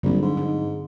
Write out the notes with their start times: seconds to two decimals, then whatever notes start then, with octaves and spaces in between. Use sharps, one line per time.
0.03 A#1 G2 D3 F#3 C4
0.22 G#2
0.37 D#4